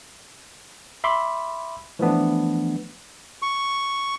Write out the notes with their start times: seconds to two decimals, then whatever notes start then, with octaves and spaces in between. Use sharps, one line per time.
1.04 E5 B5 C6 D6
1.99 E3 F3 A3 B3 D4
3.42 C#6